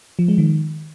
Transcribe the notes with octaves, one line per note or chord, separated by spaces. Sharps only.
F3
G#3
D#3